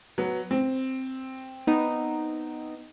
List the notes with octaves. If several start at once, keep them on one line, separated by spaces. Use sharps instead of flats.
F#3 B3
C4
B3 D#4